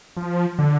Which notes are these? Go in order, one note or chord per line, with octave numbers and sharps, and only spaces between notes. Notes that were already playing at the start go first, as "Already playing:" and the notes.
F3
D3